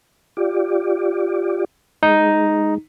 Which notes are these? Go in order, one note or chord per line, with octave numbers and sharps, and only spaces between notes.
F4 G4 D5
G#3 D#4